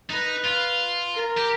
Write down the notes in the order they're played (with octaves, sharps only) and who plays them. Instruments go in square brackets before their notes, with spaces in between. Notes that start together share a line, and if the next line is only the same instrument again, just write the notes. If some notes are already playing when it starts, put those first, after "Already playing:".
[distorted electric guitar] D#4 [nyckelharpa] B4
[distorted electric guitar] F4
[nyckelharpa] A#4
[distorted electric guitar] G4